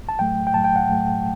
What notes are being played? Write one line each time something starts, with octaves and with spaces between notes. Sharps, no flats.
A5
A2 F#3 A3 G5
G5
A2 F#3 A3 A5
G5
F#5
A2 F#3 A3